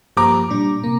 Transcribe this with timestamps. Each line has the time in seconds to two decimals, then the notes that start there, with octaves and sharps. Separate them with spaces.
0.17 G2 F3 A#3 G4 C5 A#5 D6
0.50 A#2 G3 D4
0.84 C3 A#3